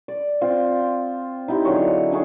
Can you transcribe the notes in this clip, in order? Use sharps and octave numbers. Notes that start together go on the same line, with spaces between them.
D5
C4 F4
D#4 E4 G4 C6
D3 F#3 G#4 C#5
D4 D#4 G#4 C#5